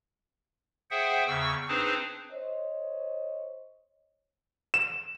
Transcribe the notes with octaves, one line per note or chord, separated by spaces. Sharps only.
G#4 C5 E5 F#5 G5
E2 C#3 C#6 E6
C4 D4 D#4 G#4 B4 C5
C5 C#5 D#5
E7